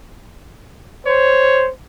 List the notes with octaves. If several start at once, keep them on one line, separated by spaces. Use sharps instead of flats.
C5 C#5